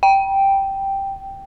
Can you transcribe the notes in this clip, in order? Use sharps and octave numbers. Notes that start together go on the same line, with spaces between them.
G5